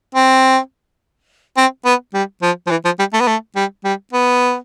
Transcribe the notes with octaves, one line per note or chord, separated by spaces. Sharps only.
C4
C4
B3
G3
F3
F3
E3
F3
G3
A3
B3
A3
G3
G3
B3